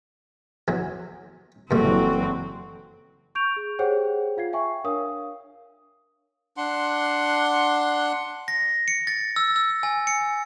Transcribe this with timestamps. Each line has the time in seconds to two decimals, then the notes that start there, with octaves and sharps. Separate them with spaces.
0.68 E2 F#3
1.71 F#1 A#2 E3 F#3 G3 C4 F#4 A4
3.35 C#6 G6 D7 F7
3.56 G#4
3.79 G4 G#4 C5 C#5 F#5 G5
4.37 F4 F5 G#6 C7
4.53 E5 G5 G#5 C#6
4.84 D4 A#4 C#5 F5 D#6
6.57 D4 F#5 C6
8.48 A#6
8.88 C#7
9.07 A6
9.36 E6
9.56 E6
9.83 G#5
10.07 C#7